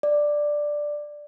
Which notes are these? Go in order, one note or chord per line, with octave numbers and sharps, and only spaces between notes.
D5